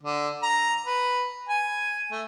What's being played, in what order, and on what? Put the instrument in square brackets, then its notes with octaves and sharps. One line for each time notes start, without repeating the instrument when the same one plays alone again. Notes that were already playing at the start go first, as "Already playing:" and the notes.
[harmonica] D3
A#5
B4
G#5
A3